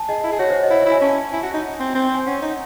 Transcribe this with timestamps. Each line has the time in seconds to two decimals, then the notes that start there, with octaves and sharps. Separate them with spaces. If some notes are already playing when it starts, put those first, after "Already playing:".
Already playing: G#5 A5
0.08 G#4 D#5
0.24 E4
0.32 G#4
0.39 F#4 C#5
0.50 C5
0.63 D#5
0.70 E4 C#5
0.81 E4 E5
0.92 G#5
1.01 C#4 A5
1.33 E4 G#5
1.43 F#4
1.53 D#4
1.80 C4
1.95 C4
2.14 G#5
2.26 C#4 F#5
2.42 D#4